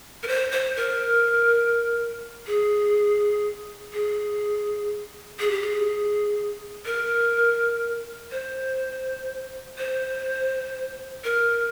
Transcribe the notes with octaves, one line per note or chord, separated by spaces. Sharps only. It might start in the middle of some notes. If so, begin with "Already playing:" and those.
A#4
C5
C5
A#4
G#4
G#4
G#4
G4
G#4
A#4
C5
C5
A#4